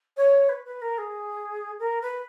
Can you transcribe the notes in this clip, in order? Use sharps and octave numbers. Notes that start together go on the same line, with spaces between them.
C#5
B4
B4
A#4
G#4
A#4
B4